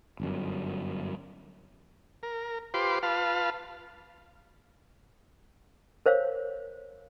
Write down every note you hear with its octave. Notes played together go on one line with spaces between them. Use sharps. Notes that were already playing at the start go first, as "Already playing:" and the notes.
G1 F#2
A#4
F4 G4 B4 C5 C6 D6
F4 B4 F5 A5
A#4 C5 C#5 F5